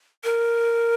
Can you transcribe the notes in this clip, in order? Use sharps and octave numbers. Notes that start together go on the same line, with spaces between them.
A#4